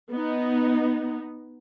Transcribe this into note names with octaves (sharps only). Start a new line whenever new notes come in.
B3 D#4